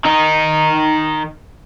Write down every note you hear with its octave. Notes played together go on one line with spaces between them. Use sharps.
D#3 D#4